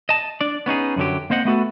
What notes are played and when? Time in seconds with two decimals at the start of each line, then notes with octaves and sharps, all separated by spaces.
0.09 D#5 A5
0.41 D4 D5
0.66 B3 C#4 D#4 G#4
0.96 F#2 D3 F#3 G4
1.30 A#3 C4 C5 D#5 F#5
1.45 A3 B3 F#4 A4